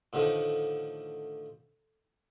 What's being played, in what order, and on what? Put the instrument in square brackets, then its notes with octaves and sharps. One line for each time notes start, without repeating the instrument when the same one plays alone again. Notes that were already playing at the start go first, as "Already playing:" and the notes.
[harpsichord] A2 D3 D#3 F3 A3